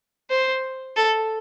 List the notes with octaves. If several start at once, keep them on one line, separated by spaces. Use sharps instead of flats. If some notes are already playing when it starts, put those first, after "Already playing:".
C5
A4